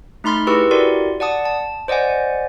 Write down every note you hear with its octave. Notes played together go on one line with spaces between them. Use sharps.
A3 D#4 B5 C6 F6 A6
E4 G4 G#4 B4 C#6 E6
E4 F#4 G4 A#4 D5 C6
D5 F#5 A5 D#6
A5
C5 D5 D#5 F#5 G#5